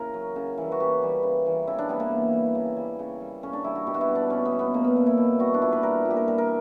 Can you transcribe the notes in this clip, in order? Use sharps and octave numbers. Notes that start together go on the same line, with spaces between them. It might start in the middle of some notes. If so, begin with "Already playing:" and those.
Already playing: C#3 E4 A#4
F#3
C#3
E3 G3
F#4
C#3 G4
E3 G3
C#3
E3 G3
C#3 E4
D4
E3 G3 B3
A#3
C#3
G3
C#3
G3
C#3
G3
C#3 C#4
D4
G3 E4
F#4
B2 G4
F#4
E4
G3
D4
B2 C#4
B3
G3
B3
B2 A#3
B3
G3 A#3
E4
B2
G3 F#4
D4
A#2 E4
B4
G3 A#4
A#2
G4
A#4
G3 A#4
A#4